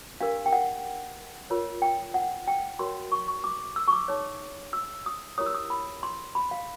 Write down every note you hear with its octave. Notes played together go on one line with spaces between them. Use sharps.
D4 G4 A#4 F5
G5
F#5
F4 A#4 C#5
G5
F#5
G5
F#4 A#4 C#5 C6
C#6
C#6
D6
E6
C#6
D6
D#4 G#4 C#5
E6
D#6
E4 G4 A#4 C#5 D#6
E6
D#6
B5
C6
B5
F5